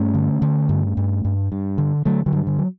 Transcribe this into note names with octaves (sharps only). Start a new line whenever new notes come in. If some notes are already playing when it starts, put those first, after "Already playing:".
Already playing: G2 A3 C#4
D3
D3
G2
G2
G2
G2
D3
D3 F#3 A3
D3 F#3
G2
D3
F#3